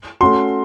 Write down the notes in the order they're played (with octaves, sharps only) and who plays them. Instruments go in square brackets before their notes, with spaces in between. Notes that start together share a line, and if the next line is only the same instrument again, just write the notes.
[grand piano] A3 C#4 F#4 [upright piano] C6